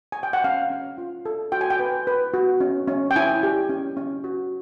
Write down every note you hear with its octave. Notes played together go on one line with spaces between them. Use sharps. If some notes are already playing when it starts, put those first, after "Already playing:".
G#5
G5
F#5
C#4 F5
C#4
F4
A4
F#4 G5
G#5
G5
B4
B4
F#4
C#4
C#4
G5
E4 G#5
G4
C#4
C#4
F#4